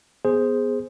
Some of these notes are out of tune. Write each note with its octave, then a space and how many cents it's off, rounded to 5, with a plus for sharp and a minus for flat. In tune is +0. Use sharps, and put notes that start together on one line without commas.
B3 +0 G#4 +0 C5 +0